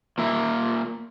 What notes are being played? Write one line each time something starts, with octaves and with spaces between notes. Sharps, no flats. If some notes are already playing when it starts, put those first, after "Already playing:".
A#2 A#3 E5